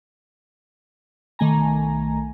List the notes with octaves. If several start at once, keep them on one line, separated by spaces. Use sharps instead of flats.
B1 D#3 A3 G#5 A#5